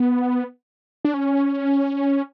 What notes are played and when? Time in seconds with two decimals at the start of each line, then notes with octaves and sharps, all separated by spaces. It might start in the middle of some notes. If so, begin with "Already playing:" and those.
Already playing: B3
1.05 D4
1.14 C#4